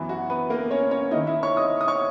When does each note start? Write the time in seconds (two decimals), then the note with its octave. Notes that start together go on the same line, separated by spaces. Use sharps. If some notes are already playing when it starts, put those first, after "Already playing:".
Already playing: F#2 E3 B3 E4
0.09 F#4
0.30 B3 B4
0.50 A#3 A#4
0.70 C#4 C#5
0.91 C#4 C#5
1.11 D#3 A#3 D#4 E4 D#5
1.27 E4 E5
1.43 C#5 C#6
1.57 D#5 D#6
1.81 D#6
1.88 C#5 C#6